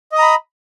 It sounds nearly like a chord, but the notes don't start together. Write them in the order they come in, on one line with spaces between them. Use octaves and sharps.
D#5 D#6 A#5 B5